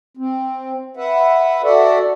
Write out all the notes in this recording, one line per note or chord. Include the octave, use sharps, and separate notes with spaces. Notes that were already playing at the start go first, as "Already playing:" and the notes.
C4
B4 E5 F#5
F#4 A4 D5 E5 F#5